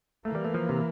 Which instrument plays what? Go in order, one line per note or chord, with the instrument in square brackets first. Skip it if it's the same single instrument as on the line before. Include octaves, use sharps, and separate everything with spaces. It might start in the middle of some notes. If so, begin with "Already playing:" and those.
[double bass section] E3 A#3 [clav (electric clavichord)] A3
[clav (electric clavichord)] G3
A3
F3
C3